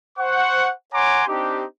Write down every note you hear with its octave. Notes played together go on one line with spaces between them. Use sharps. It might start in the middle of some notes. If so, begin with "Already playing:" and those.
C5 F#5 C#6
C#5 F#5 G#5 A#5 C6 D6
C4 D4 D#4 G4